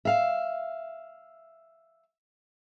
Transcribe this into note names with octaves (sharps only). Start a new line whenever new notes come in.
E5 F5